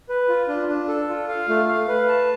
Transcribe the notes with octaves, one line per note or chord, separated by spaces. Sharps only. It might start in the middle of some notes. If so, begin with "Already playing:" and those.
B4
F4
D4
D4
A4
F4
F5
A3
F5
B4
A5